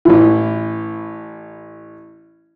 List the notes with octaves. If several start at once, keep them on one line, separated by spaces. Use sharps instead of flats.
A1 E3